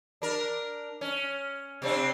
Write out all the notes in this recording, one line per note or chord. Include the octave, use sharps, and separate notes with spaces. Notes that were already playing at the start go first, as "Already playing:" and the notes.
D4 A#4
C#4
C3 C4 D4